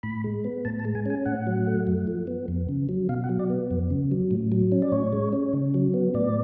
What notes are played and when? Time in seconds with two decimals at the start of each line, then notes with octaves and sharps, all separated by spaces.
0.03 A2 B5
0.24 G#3
0.44 B3
0.65 A2 A5
0.79 A5
0.85 G#3
0.95 G#5
1.06 C#4 G#5
1.25 A2 F#5
1.47 F#3
1.67 A3
1.87 F#2
2.07 F3
2.27 B3
2.48 F2
2.69 C#3
2.89 F#3
3.09 B2 F5
3.24 F#5
3.29 F#3
3.39 D5
3.50 B3
3.71 F2
3.90 C#3
4.11 F#3
4.31 A2
4.52 F#3
4.72 C#4
4.82 D5
4.92 A2 C#5
5.13 G#3
5.33 C#4
5.53 C#3
5.74 F#3
5.94 B3
6.14 A2 D5